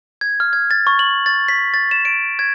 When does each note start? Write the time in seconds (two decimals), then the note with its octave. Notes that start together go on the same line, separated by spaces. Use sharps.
0.21 G#6
0.40 F6
0.53 G#6
0.71 A6
0.87 C#6
0.99 F#7
1.26 A6
1.48 B6
1.74 A6
1.91 E7
2.05 D7
2.39 G#6